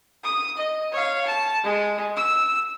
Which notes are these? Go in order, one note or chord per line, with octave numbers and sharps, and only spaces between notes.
D#6
D#5
C#5 F5
A5
G#3
E6